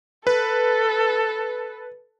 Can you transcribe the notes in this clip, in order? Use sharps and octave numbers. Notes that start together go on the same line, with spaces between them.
A4 B4